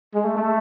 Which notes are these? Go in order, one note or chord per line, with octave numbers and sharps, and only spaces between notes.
G#3
A3
A3